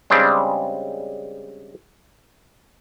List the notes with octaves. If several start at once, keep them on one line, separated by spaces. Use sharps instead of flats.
C#3 G3 G#3 C4 D4